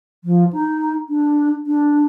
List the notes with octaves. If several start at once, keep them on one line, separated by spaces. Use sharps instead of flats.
F3
D#4
D4
D4